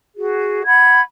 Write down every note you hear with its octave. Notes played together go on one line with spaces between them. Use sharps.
F#4 G#4
F#5 B5 G#6